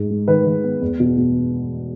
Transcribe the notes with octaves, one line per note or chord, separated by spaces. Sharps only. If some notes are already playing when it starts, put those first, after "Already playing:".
Already playing: G#2 G#3
G#3
D#3 B4
D#3
B3
E2
B2
B2